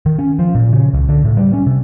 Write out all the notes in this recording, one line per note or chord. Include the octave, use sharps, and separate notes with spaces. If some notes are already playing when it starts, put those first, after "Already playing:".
D#3
C#4
F3
A#2
C#3
C#2
D3
A2
G3
C#4
C3